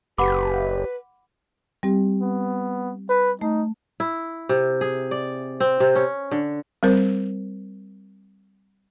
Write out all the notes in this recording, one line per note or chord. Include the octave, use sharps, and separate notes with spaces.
F#1 G4 B4 F#5 B5 D6
G3 C4 G4
B3
B4
A3 D#4
E4
C3
G#4
D5
C4
C3
C#4
D3
G3 C4 A#4 C5